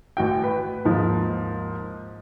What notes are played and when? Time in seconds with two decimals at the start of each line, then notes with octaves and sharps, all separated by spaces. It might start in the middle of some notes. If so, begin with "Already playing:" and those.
0.17 A1 F#4 G5
0.44 B4
0.84 D#2 G#2 F3